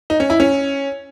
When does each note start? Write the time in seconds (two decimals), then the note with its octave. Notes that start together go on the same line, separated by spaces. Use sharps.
0.10 D#4
0.20 C#4
0.30 E4
0.40 C#4